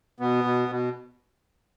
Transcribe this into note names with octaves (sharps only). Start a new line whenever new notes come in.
B2 B3
B2
B2